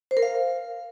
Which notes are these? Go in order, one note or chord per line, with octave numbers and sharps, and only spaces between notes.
C5
A#4
F5